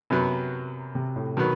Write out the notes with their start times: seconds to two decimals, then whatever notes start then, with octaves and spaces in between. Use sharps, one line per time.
0.10 F#2 C3 F#3 B3
0.95 C3
1.16 A2
1.37 B2 D#3 F#3 B3